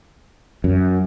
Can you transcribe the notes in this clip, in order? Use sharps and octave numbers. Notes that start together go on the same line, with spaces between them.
F#2